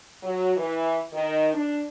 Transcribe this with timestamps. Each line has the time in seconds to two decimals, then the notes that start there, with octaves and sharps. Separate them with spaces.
0.23 F#3
0.57 E3
1.13 D#3
1.53 D4